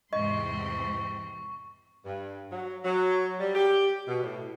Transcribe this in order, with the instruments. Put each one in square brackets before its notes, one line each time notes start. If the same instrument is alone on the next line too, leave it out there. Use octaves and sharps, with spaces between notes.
[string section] E2 G#2 C6 [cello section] C3 E3 C4 [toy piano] D#5 [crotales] C#6
[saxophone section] G2
F#3
F#3
G3
G4
B2
A2